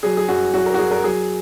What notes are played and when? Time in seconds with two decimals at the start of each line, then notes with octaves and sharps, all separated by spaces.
0.03 F#3 G#4
0.17 G#4
0.28 F#2 F#4
0.54 F#3 F#4
0.66 A#4
0.74 F#4
0.78 F#3 G#4
0.91 A#4
1.03 F#3 G#4